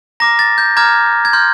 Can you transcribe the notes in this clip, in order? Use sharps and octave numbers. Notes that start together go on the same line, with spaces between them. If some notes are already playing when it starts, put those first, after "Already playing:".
A#5 D6 F6 A#6
A6
G6
A#5 D6 F6 G#6
G#6
C6 F6 G6